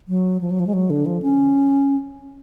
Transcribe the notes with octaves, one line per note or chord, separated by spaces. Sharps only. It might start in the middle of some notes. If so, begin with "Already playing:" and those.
F#3
F3
F#3
F3
G#3
F#3
D3
F3
C#4